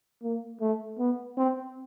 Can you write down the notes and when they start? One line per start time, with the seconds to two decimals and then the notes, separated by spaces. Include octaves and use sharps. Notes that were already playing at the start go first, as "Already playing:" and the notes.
0.23 A#3
0.61 A3
0.99 B3
1.37 C4